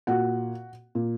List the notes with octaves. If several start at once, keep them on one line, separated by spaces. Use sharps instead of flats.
A#2 F#4 F#5
A#2